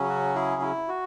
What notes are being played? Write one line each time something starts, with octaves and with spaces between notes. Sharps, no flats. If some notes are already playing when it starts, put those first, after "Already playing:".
Already playing: C#3 F#3 C#4
F#4
E4 G#4
E4
F#4